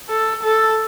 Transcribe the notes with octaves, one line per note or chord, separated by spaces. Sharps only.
A4
A4